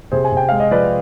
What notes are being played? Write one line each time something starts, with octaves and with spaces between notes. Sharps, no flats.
C3 G#4 C5
G#5
C3 G5
G#3 F5
D#5
F3 B4 D5